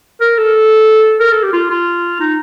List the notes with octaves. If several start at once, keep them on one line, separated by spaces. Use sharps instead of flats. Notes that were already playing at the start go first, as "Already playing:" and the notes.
A#4
A4
A#4
A4
G4
F4
F4
D#4